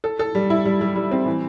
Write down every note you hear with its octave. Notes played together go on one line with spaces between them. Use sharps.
A4
A4
G3
E4
G3
G3
G3
C4
E3